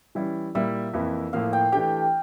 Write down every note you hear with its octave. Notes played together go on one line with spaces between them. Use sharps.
E3 G3 C#4 E4
A#2 G3 A#3 E4 E5
F2 E3 A#3 E4
A2 F3 A#3 F5
G5
E3 A3 D4 G4 G5